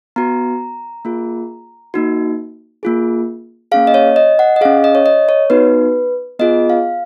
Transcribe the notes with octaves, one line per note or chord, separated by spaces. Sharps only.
B3 F#4 A#5
A#3 F4 G#4
A#3 D#4 F#4
A#3 F4 G#4
A#3 C#4 G#4 F5
D#5
C#5
D#5
F#5
D#5
C#4 G#4 F5
D#5
C#5
D#5
C#5
B3 D#4 F#4 B4
B3 F4 G#4 D#5
F5